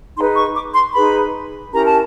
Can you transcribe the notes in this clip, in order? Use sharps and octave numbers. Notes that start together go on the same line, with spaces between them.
D#4 G#4 B4 C6
C#6
D6
C6
D#4 G#4 B4 B5
C#4 E4 G4 A#4 A#5
A5